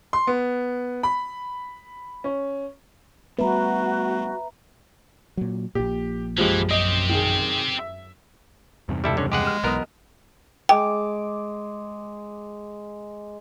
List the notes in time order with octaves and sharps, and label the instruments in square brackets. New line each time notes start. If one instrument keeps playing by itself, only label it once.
[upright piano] C6
B3
B5
C#4
[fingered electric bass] G3 A3 B3 [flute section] F#4 [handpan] B4 [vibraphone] E5 A#5
[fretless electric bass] A#2 F#3
[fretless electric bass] A#1 A#2 [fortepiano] G4
[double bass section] F#2 [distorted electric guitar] E3 [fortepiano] F3 G#3 G4
[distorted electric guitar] C4 G4 [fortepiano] D#5
[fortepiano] D#3 G#4
E5
[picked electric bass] E2 G2 C3
[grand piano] F1 C#2 [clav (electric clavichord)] G3 E4 A4
[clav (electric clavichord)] D3 C#4
[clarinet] G#3 [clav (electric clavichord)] G4 G#4 F#5
[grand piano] F6 E7
[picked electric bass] B1 [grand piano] E2 D#5 D#6 [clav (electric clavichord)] B3 A#4
[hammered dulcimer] G#3 D6 [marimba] G5